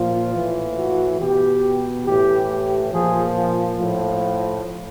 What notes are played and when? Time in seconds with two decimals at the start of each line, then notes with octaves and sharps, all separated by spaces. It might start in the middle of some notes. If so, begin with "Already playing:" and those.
Already playing: A#2 F3 F4
0.34 A2 E3
0.77 F#4
1.20 B2 G4
2.06 A2 E3 G4
2.50 G4
2.92 A#2 F3 G#4
3.36 F4
3.79 A2 F3 F4